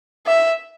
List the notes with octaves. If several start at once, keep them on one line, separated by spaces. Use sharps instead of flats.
E5